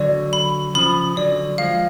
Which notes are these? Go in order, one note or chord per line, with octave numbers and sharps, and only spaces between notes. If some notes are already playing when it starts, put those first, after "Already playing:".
Already playing: D3 F#3 D5
B5
C#3 F3 B5
D3 F#3 D5
F3 G#3 F5